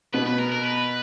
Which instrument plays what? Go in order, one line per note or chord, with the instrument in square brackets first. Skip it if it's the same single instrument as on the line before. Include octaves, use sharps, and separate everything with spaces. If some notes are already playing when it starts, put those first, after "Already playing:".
[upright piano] B2 B3 [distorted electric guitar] B4
[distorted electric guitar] B4
A#4
A#4
B4